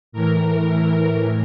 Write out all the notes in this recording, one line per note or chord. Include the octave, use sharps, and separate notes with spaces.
A2 E3 A#4